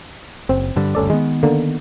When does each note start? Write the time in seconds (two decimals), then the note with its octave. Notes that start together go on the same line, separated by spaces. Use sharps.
0.49 F#1 C4
0.76 G2 D3 G3
0.95 F#1 D2 G2 C#4 A4 D5
1.10 D#3 G#3 B3
1.43 D3 A#3